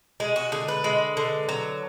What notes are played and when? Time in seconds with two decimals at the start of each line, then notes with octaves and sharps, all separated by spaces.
0.20 G#3 G#4
0.36 F#4
0.52 D3 G#4
0.68 B4
0.84 G#3
1.17 D3
1.49 F#3